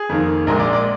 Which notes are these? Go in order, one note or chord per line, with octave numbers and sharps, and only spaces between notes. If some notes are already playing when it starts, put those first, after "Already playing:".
Already playing: G#4
F2 D#3 A#3
A#1 A#2 G#3 A#4
D5
D5